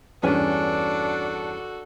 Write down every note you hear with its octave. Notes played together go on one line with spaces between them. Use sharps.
E2 G2 C#4 D4 F#4 A4 B4 G#5